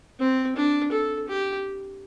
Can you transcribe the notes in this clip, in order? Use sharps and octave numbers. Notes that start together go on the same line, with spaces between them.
C4
D4
A4
G4